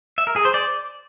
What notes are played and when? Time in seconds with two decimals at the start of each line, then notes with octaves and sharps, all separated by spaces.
0.18 E5
0.27 A#4
0.36 G#4
0.45 C5
0.54 D5